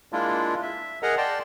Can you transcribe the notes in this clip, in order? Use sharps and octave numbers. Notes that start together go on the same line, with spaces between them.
G#3 A#3 D4 E4 F4
E5
G#4 A#4 D#5 F#5 A#5
D5 G5 A5 C6